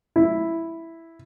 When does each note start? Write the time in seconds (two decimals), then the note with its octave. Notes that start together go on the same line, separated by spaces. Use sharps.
0.16 E4